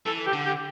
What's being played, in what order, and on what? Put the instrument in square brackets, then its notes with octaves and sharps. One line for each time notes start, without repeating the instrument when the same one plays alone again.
[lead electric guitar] E3 [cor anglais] A4
[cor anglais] G4
[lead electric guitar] D3
[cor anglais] G4